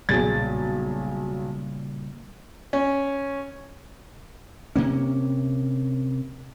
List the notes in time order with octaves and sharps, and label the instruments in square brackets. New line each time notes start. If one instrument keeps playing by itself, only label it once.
[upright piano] B1 G#4 A6 [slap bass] A#2 C#3 G3
[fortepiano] C#4
[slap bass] C3 A#3 C#4